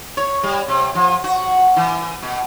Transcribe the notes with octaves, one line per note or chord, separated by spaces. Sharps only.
C#5
G3
C3
F3
F#4
E3
B2